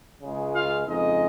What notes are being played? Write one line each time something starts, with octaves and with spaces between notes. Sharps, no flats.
C#2 C#3 G#3
F4 F5
F2 C#3 G#3 B3 D#4 D#5